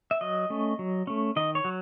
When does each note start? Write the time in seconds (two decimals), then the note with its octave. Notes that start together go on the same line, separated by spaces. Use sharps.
0.11 E5
0.21 F#3 D#5
0.50 A3 C#4
0.79 F#3
1.07 A3 C#4
1.36 D#3 D#5
1.55 C#5
1.65 F#3